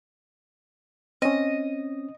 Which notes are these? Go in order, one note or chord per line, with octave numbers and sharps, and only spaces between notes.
C4 C#4 D#5